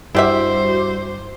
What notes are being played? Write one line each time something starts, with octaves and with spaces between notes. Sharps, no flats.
G2 G3 E4 F#4 G4 C5 E5 D6